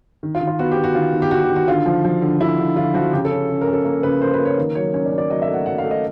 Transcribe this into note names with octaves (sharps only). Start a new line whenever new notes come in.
D#3
F4
D#3
F4
B3 F#4
G4
B3
F#4
D#3 F4
D#3
G4
D#3 F#4
G4
D#3
F#4
D3 F4
F3
F3
D3
D3 E4
D3
D3 F4
F3 F#4
C#3 G4
A4
C#4
C#3
A#4
C#4
A4
A#3 A#4
C#3 B4
A#3 C5
B4
A#3
C#5
D#3
F#3 C#5
C#4 C#5
D5
C#4
D5
F#3 D#5
E5
A3
F#5
F#3 F#5
F5
A3
D#5